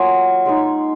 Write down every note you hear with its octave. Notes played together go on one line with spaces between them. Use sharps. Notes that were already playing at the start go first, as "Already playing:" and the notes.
Already playing: F#3 A#3 F4 G#5
G#3 D#4